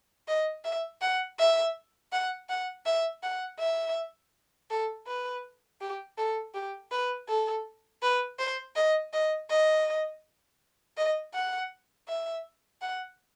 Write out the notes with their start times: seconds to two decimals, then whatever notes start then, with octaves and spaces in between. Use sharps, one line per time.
0.28 D#5
0.64 E5
1.02 F#5
1.39 E5
2.12 F#5
2.49 F#5
2.86 E5
3.23 F#5
3.60 E5
4.70 A4
5.07 B4
5.81 G4
6.18 A4
6.55 G4
6.92 B4
7.28 A4
8.03 B4
8.39 C5
8.76 D#5
9.13 D#5
9.50 D#5
10.97 D#5
11.34 F#5
12.08 E5
12.82 F#5